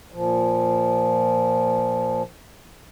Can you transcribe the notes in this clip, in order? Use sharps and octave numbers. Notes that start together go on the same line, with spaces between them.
A#2 F3